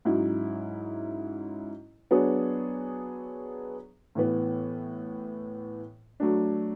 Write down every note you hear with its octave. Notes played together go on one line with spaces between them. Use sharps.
G#2 F#3 C#4 E4
F#3 B3 D4 G#4 C#5
A2 E3 B3
F#3 A3 D4